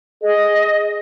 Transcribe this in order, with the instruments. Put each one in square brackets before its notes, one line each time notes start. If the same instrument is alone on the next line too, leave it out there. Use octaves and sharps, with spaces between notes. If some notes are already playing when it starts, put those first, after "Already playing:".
[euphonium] G#4 [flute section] D#5